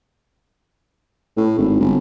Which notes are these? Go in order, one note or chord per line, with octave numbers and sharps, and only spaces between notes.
A2
G#1
G1